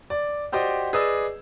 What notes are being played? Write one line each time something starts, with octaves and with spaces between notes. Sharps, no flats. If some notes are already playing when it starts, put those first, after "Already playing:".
D5
F#4 G4 C5 D5 D#5 G5
G#4 B4 D5 D#5 D#6 E6